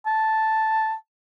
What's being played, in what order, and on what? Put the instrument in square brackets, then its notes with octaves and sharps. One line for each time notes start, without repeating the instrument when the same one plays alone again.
[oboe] A5